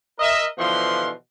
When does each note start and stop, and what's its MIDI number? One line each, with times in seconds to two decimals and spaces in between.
0.18 0.44 70
0.18 0.44 75
0.18 0.44 76
0.57 1.09 47
0.57 1.09 50
0.57 1.09 52
0.57 1.09 53
0.57 1.09 77
0.57 1.09 84